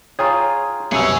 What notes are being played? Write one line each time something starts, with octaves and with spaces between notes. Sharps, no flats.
F4 G#4 C#5 G5 A#5 C#6 D#6
C2 F#2 B2 G#4 C#5 E6 C#7